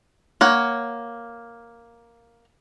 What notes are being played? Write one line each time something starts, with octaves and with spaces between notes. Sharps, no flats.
A#3 C#5 F#5